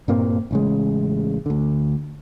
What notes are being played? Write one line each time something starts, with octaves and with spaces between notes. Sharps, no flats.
G2 A#2 A#3 C4
A1 C#3 G#3
D2 D3